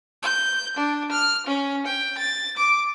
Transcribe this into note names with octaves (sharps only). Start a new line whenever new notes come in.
G6
D4
F6
C#4
G5
A6
D6